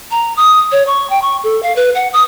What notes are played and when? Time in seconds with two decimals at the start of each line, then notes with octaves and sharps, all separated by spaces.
0.11 A#5
0.37 D#6
0.72 C#5
0.87 C#6
1.10 G5
1.22 C#6
1.44 A4
1.63 F5
1.76 B4
1.95 F#5
2.13 D#6